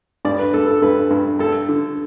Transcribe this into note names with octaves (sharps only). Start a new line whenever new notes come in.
G2 D5
B4
G2 A4
A4
G2 B4
G2
G2 A4
D3